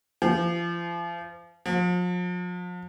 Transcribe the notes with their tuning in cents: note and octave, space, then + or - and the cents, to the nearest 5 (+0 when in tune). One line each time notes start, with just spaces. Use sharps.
F3 -35
F3 +40